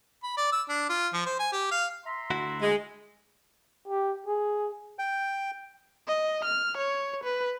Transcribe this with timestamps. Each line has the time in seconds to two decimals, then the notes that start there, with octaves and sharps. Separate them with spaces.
0.23 B5
0.37 D5
0.52 E6
0.69 D4
0.90 F4
1.13 F3
1.26 C5
1.39 G#5
1.52 G4
1.71 F5
2.05 E5 A#5 C6
2.30 D2 E4 F#4
2.61 G#3
3.88 G4
4.26 G#4
4.99 G5
6.08 D#5
6.45 F6
6.78 C#5
7.24 B4